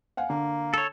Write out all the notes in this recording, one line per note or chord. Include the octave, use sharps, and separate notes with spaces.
F5 F#5 G#5
D3 A#3
A4 C#5